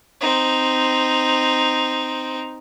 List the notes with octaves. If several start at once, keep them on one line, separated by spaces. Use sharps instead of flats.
C4 D#4